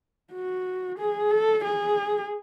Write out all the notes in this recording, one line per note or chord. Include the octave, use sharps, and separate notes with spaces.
F#4
G#4
A4
G#4